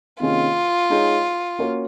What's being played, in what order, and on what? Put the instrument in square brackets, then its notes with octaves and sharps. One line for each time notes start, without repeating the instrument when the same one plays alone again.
[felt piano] C3 D#3 A#3 C#4 G#4 [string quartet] F4
[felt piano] G#3 D#4 G#4 C#5
A#3 C#4 F#4 A#4 C#5